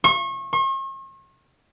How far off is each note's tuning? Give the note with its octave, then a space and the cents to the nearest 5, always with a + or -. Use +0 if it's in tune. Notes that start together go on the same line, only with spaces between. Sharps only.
C#6 -35
C#6 -45